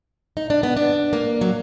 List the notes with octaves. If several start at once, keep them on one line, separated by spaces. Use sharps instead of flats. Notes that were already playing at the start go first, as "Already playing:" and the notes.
D#4
D4
B3
D4
A#3
F#3